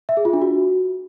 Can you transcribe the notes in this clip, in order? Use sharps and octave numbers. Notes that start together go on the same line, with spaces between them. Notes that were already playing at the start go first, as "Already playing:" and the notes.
E5
G#4
F4
D4
F#4